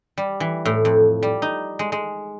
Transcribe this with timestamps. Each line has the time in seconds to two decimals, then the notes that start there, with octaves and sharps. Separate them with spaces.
0.17 G3
0.40 E3
0.65 A2
0.85 F2
1.23 G3
1.42 D#4
1.79 G#3
1.92 G#3